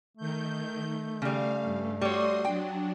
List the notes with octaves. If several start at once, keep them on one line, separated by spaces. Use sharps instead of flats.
D#3 A3 G6
C#3 G3 F5
G2
G3 F#4 C#5 C6 D#6
F#3 D4 G5